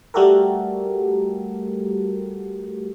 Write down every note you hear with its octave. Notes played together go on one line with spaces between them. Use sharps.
G3 A3 F#4 G4 A4 A#4